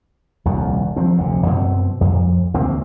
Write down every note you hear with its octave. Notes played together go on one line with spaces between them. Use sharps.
D#1 C2 F2
F3 C4
F1 D2 D3
F#2 B2 C4
F2
E1 D2 A#3 C4